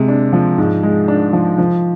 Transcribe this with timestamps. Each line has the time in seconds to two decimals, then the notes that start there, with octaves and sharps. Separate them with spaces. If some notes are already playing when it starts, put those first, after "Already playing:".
Already playing: C3 G#3
0.08 D4
0.33 F3
0.58 G#2
0.83 G#3
1.08 D4
1.33 F3
1.58 F3